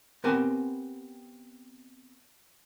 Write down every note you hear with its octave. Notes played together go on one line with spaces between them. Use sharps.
B3 C4 G4 A#4 G#5 A5